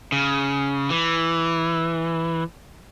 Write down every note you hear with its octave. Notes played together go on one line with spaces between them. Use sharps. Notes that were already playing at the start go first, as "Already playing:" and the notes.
C#3
E3